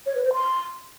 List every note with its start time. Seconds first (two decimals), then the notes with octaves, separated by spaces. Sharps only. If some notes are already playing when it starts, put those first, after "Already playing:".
0.06 C#5
0.15 B4
0.24 C5
0.33 C6